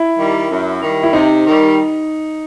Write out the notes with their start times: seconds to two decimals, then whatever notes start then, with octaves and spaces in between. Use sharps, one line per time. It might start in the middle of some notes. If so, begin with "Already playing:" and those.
Already playing: E4
0.17 D#3 G3
0.49 F#2
0.81 D#3 G3
1.03 E4
1.13 C3 D#4
1.45 D#3 G3